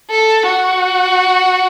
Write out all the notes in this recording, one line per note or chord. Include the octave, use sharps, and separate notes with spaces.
A4
F#4